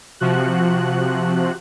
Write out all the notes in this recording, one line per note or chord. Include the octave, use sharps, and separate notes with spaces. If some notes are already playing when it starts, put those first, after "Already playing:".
C3 F3 F#4 F#6